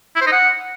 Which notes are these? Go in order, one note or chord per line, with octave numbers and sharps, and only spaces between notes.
E4
C5
D#4
F#5